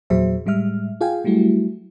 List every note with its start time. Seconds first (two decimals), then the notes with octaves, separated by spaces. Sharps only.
0.10 E2 A#2 F#3 G#4 C5 E5
0.46 A2 G3 G#3 E5 F6
1.01 F4 G#4 F5 G5 G#5
1.24 F#3 G3 A3 E4 F#4